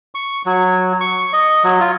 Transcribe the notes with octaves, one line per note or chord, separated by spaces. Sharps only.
C#6
F#3
C#6
D#5
F#3
F4